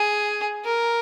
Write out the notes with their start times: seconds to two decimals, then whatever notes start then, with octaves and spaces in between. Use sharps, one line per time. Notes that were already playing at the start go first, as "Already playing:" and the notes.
Already playing: G#4
0.65 A#4